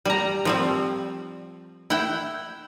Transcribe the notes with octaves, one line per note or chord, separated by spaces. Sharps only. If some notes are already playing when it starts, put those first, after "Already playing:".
G3 A#5
F3 G3 C4
E4 F#5 G5